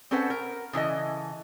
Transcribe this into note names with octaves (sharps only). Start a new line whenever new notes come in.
C4 C#4 A4 B4 C5 F#5
A#4
C#3 E3 A4 D#5